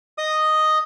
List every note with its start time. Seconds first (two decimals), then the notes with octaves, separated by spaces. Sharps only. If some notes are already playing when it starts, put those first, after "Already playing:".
0.18 D#5 D#6